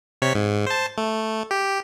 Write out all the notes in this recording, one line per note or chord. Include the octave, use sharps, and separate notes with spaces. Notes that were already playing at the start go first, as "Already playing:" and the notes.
C3 C#5 B6
G#2
C5 A5
A3
G4